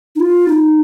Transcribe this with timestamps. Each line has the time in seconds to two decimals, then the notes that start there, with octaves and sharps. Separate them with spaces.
0.16 D#4
0.20 F4
0.48 D#4